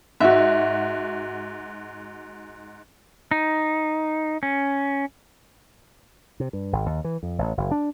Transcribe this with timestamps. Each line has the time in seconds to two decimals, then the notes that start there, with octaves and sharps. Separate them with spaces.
0.21 G#2 F#4 E5
3.31 D#4
4.43 C#4
6.40 C3
6.53 G2
6.73 G#1
6.86 D#2
7.04 E3
7.23 F2
7.38 A1
7.57 F#1
7.71 D4